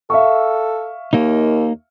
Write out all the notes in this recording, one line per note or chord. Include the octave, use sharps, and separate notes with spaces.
A4 E5 F5 C#6
D#2 A#3 D#4